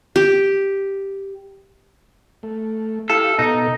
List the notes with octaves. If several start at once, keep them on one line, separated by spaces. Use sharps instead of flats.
G4
A3
E4 G4 A4 F5
B2 D#4 A4